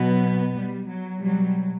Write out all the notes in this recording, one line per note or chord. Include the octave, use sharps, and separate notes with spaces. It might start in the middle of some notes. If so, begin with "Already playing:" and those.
Already playing: B2 F#3 B3
G3
F#3
B2 F#3 G3